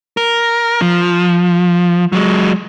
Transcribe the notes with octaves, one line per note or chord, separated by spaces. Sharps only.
A#4
F3
F#3 G#3